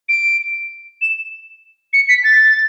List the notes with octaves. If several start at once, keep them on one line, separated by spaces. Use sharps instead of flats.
D7
E7
C#7
B6
A6